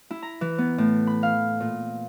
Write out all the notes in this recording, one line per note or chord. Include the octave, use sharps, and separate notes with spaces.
E4
A#5
E3
B3
A2
B5
F5
A#2